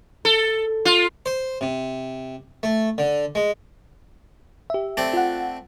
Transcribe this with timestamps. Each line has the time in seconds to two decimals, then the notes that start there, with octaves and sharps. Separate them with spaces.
0.25 A4
0.85 F4
1.26 C5
1.61 C3
2.63 A3
2.98 D3
3.35 G#3
4.70 G4 E5
4.97 A3 C4 D5
5.13 F4 F#5